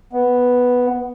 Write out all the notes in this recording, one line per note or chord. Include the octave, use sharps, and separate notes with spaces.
B3